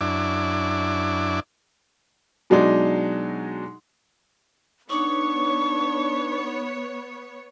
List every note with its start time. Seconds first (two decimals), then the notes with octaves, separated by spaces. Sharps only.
0.01 F#2 D4 E4 D6
2.50 B2 F#3 G#3 D4 D#4
4.90 B3 D4 D#4 C#5 C#6 D6